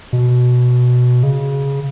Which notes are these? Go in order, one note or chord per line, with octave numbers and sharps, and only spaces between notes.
B2
C#3